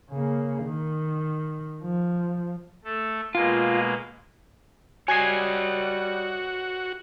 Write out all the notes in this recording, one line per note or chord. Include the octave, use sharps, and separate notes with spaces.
C#3 A#3
D#3
F3
A3 A4
B2 G#3 A#3 F4
G3 F#4 C#5 D#5 G#5 G#6 C7